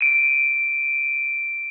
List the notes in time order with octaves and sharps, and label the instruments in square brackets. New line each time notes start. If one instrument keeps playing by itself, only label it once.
[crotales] D7 D#7